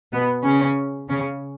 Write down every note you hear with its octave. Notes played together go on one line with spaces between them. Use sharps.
B2 B3
C#3 C#4
C#3 C#4